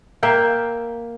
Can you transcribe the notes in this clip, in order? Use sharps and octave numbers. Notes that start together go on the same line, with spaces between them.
A#3 E5 F5 G5